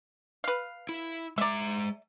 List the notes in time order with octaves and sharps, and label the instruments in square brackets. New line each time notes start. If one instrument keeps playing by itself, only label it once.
[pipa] B4 F5
[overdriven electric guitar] E4
[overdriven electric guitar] G#3 A#5 [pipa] D5 E5